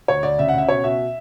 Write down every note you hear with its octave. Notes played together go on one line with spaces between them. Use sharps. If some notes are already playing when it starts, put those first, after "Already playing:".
D2 C#5
D2 D5
C#3 E5
F#5
C#3 E5
B2 C#5
B2 E5